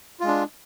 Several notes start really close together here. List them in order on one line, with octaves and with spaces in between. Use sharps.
F4 G#3 D4